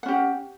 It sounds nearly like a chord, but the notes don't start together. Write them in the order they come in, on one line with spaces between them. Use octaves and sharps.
F#5 C#4 G4